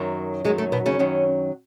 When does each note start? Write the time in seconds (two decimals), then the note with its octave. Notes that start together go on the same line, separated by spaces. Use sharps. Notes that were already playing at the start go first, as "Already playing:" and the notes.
Already playing: F#2 D#3 F#3
0.44 F#2 D#3 F#3 G#3
0.58 A3
0.72 B2 B3
0.86 C#3 C#4
0.99 F#2 D#3 F#3